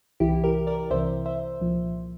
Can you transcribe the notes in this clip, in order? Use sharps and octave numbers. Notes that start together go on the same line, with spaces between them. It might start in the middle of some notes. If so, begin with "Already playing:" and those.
C2 C3 E3 E4 G4
G4 A#4
A#4 D5
C2 C3 E3 C5 E5
C5 E5
C2 A#2 F3